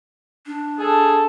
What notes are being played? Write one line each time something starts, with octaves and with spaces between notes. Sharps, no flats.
D4
G#4 A4